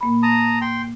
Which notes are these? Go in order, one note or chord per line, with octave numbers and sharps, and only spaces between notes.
A#2 A#3 B5
A5 A#5 D#6
G5 C6